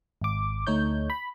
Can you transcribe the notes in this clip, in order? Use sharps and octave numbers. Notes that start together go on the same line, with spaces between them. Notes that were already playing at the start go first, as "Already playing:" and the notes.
G#1 D6
D2 A3 D#4 C#5 G6
B5